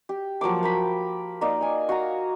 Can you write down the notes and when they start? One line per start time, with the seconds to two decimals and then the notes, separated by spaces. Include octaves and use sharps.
0.09 G4
0.41 F3 F#3 A#3 D6
0.63 A#3 G5 B5
1.41 A#3 D#4 D5
1.61 G#5 C#6
1.89 F#4 F5 A#5